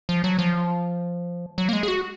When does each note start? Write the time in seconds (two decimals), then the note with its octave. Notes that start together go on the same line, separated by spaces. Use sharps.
0.09 F3
0.24 F#3
0.39 F3
1.58 F#3
1.69 A#3
1.73 G#3
1.83 G#4
1.88 F#4